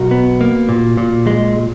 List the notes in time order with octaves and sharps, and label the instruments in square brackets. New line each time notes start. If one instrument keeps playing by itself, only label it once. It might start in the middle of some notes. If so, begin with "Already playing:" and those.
Already playing: [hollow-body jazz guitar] B1 F#4 A#4
B3
A#3
A#2
A#2
G#3